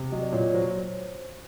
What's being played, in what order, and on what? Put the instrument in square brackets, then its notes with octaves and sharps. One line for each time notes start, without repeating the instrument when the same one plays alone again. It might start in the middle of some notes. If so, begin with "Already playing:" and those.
Already playing: [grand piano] C3
[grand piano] F#3 [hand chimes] D#5
[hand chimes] D5
[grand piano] A#2 [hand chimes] C#5
[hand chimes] C#5
[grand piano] F#3 [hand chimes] C5